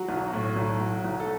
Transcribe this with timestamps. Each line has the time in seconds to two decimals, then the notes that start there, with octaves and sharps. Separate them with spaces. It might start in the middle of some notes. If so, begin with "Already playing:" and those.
Already playing: F#3 F#4
0.09 B1
0.33 A2
0.56 B1
0.81 F#3
1.04 B1
1.20 A4